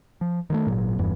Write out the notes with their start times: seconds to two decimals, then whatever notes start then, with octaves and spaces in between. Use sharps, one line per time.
0.21 F3
0.50 D#3 G3 A3
0.67 G#1 A#2 F#3
0.98 G1 E2 G2 E3